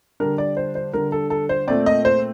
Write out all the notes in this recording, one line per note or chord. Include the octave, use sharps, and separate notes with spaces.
D3 G3 D4 A#4
D5
C5
C5
D3 G3 D4 A#4
A4
A4
C5
A#2 A3 C4 D5
D#5
C5